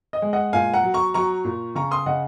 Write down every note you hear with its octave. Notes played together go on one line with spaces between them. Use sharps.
D#5
G#3
D#5 F#5
A#2 F5 G#5
F#5 A#5
F#3
A#5 C#6
F#3 A#5 C#6
A#2
C#3 A#5 C#6
C6 D#6
C#3 D#5 F#5